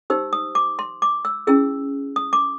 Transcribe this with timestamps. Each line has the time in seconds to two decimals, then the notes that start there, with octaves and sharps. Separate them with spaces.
0.10 D#4 G4 C5 E6
0.33 D#6
0.55 D6
0.79 C6
1.02 D6
1.25 E6
1.47 C#4 E4 G#4 E6
2.16 D#6
2.33 D6